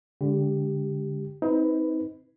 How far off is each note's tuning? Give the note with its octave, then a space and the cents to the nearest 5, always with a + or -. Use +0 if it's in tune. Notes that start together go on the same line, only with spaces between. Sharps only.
D3 -30 G#3 -20 G4 +0
C4 +0 D#4 +30 B4 +10